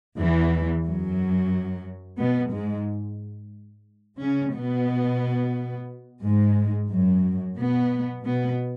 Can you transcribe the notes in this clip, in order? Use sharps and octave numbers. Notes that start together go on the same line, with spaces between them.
E2 E3
F#2 F#3
B2 B3
G#2 G#3
C#3 C#4
B2 B3
G#2 G#3
F#2 F#3
B2 B3
B2 B3